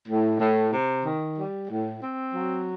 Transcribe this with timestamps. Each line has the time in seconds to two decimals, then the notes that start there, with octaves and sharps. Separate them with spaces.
0.08 A2
0.40 A2
0.72 C3
1.04 D#3
1.37 G3
1.69 A2
2.02 C4
2.34 F#3